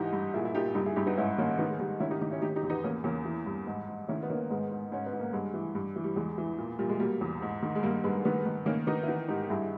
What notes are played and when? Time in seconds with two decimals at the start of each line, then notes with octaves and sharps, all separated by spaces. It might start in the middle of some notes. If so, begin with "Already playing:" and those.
Already playing: G#2 E3 D#4 G4
0.13 G2
0.34 A#2 E4 G#4
0.45 E4
0.55 A#2 D#4 G4
0.75 G2 D#4 G4
0.86 E4 G#4
0.96 G2 D#4 G4
1.07 B3 D#4
1.17 G#2 C#4 E4
1.38 D#3 A#3 C#4
1.58 D#3 B3 D#4
1.70 G#3
1.79 D#3 G3
2.00 D#3 C#4 E4
2.11 D#4 G4
2.21 D#3 D#4 G4
2.31 C#4 E4
2.42 D#3 D#4 G4
2.56 D#4 G4
2.63 E2
2.70 B3 D#4
2.84 E2 A#3 C#4
3.04 E2 A#3 C#4
3.25 E3
3.46 G2
3.67 G#2
3.88 G#2
4.08 D#3 C#4 E4
4.23 B3
4.30 D#3 A#3 C#4
4.50 G#2 G#3 B3
4.71 G#2
4.92 G#2 C#4
5.06 B3
5.13 G#2
5.19 A#3
5.33 G2 G#3
5.54 E3
5.75 G2
5.96 E3
6.04 G3
6.16 E2 G#3
6.38 E3
6.58 A#2
6.79 A#2 G3
6.89 G#3
7.00 B2 G3 A#3
7.21 E2
7.42 G#2
7.63 D#3
7.75 G#3
7.83 G2 G3 A#3
8.04 G2 G#3 B3
8.25 D#3 G#3 B3
8.46 D#3
8.66 D#3 A#3 C#4
8.87 D#3 B3 D#4
9.03 E4
9.08 E3 B3 D#4
9.28 G#2 D#4 G4
9.42 G4
9.49 G2 E4 G#4